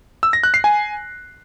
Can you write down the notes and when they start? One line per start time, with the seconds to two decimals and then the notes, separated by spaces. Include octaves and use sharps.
0.23 E6
0.33 A#6
0.43 F#6
0.54 C7
0.64 G#5